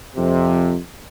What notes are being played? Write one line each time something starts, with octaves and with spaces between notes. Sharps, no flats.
F2 C3